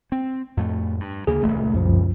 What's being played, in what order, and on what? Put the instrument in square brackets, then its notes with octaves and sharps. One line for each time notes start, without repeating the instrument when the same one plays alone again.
[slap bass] C4
F2 A2 A3
G2
[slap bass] D2 C#3 A#3 [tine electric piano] G#4
[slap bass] D#1 C#2 [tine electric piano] A3
[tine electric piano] C2 F#2 F3